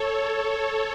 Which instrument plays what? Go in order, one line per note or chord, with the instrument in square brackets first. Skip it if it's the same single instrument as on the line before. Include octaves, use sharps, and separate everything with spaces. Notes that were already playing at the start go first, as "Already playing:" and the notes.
Already playing: [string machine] A4 C#5